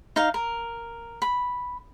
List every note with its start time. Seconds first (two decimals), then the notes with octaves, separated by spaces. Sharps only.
0.16 D#4 F5
0.34 A#4
1.22 B5